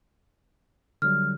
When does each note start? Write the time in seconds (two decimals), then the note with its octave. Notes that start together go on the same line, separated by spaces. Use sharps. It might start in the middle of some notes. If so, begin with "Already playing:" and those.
1.02 D3 F#3 G3 F6